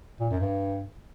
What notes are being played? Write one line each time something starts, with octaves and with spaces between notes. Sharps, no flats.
A#2
F#2
G2